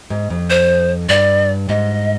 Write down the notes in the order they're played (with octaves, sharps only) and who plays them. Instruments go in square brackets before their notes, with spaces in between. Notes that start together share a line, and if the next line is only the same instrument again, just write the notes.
[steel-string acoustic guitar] G#2
F2
[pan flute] C5
[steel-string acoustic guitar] G2 [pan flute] D5
[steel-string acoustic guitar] G#2 [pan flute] D#5